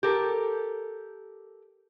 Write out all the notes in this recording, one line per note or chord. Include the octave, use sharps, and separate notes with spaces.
G4 A4 A#4